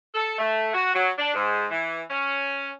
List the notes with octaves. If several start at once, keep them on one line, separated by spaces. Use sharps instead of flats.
A4
A3
F#4
F#3
D4
G#2
E3
C#4